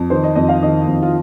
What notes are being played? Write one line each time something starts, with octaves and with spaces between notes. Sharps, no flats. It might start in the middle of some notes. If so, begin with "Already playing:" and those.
Already playing: F2
D#3 C5
D#5
F2 D#5
F5
D#3 D#5
F2
F4